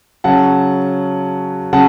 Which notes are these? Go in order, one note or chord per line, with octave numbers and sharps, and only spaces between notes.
C#3 F#3 C#4 F#5 A5
C#3 F#3 F#5 A5